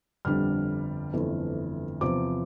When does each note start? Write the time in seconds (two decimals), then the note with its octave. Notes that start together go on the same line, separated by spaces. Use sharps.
0.25 G1 F2 D3 G3 D4 F6
1.13 G1 F2 E3 A3
2.01 E2 C3 F3 D6